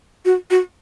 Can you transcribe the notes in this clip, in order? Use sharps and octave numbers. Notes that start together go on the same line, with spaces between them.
F#4
F#4